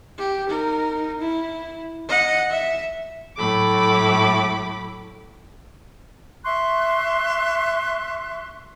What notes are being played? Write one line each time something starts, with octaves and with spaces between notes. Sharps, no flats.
G4
D#4 A#4
E4
D#5 F#5
E5
A2 F#3 A3 B5 D6
E5 C6 C#6 F#6